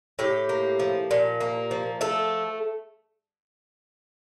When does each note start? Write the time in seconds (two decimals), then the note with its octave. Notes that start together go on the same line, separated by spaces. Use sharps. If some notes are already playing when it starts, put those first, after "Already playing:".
0.19 A2 G4
0.49 A#3
0.79 F3
1.11 A#2
1.40 A#3
1.71 F3
2.01 A3 A4